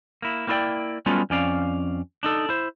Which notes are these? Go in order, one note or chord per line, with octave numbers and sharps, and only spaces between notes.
A#3 E4
A#3 C4 E4 F4 D5 G5
F#3 G3 A3 B3 C#4 F4
F2 C#4 D5 F5
D4 D#4 A4
E4 C5